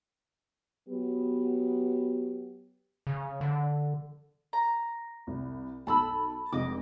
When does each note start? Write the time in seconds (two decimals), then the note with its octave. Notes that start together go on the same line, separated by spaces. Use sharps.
0.89 F#3 B3 G4
3.07 C#3
3.41 D3
4.53 A#5
5.27 C2
5.87 B1 A4 A5 B5 E6
6.53 F1 G#3 D#5 D6